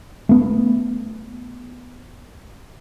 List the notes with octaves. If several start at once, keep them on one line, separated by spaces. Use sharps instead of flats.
A3 B3